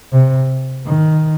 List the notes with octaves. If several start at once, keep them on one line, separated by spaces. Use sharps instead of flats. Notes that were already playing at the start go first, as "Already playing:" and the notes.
C3
D#3